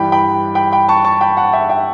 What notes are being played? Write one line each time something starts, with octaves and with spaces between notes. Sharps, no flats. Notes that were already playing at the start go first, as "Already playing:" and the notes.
Already playing: G2 E3 G5 B5
G5 B5
G5 B5
G5 B5
A5 C#6
A5 C#6
G5 B5
F#5 A5
E5 G5
E5 G5